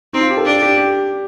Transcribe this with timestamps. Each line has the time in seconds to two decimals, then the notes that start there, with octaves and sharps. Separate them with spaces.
0.13 C4 D#4
0.21 F4
0.30 G4
0.37 A4
0.45 D4 G4
0.62 G4
0.78 G4